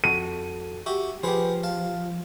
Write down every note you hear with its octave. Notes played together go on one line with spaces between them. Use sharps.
F2 F#4 A4 D#7
F#4 G4 E5
F3 G4 G#4 B4 C5 F#5
F5 A5